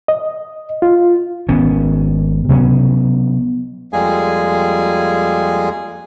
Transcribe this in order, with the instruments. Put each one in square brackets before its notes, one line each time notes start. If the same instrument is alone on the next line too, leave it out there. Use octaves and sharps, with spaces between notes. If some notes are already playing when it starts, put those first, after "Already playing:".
[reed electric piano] D#5
F4
[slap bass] G#1 B3 C#4
C3 F#3 B3 C#4
[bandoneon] F2 G3 G#3 A#3 G#4 G#5